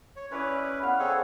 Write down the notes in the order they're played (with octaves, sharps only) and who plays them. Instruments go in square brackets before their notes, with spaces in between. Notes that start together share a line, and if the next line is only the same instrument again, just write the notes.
[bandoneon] C#5
[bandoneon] C#4 E4 B4 [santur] C#5 D5 D#6
[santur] B3 B4 F5
[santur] C4 D#5 [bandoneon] G#4 A4 C#5